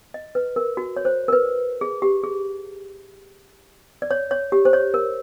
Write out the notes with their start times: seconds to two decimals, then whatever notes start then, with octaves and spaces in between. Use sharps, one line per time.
0.14 D#5
0.35 B4
0.56 A#4
0.77 F#4
0.97 C#5
1.05 C5
1.28 A#4
1.33 B4
1.81 G#4
2.02 G4
2.23 G#4
4.02 D5
4.11 C#5
4.31 C#5
4.52 G4
4.65 C5
4.73 C#5
4.94 A#4